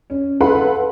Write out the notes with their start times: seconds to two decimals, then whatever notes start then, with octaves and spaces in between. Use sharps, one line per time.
0.10 C#4
0.41 A4 B4 F5 F#5 B5 C6